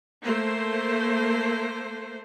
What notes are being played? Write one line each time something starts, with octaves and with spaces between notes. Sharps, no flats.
A3 A#3 C5